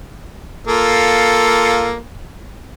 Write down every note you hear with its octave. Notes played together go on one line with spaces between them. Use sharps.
A#3 F4 A4